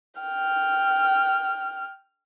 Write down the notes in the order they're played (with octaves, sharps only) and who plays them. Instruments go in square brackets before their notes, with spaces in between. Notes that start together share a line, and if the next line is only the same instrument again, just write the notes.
[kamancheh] G5 F6